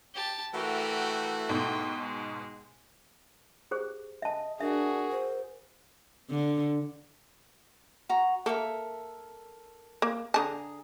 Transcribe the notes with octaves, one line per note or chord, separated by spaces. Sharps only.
G4 A5
E3 A3 F#4 G4 A#4
G#2 B2 G5
G#3
G4 G#4 C5
D#5 E5 A5
D4 F#4 G#4 A#4 E5
C5
D3
F#4 A#5
A#3 A4 A#4 E5
A#3
D3 G#4 A5 A#5 D#6